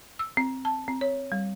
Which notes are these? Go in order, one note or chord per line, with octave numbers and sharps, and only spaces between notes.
E6
C4
A5
C4
C#5
G3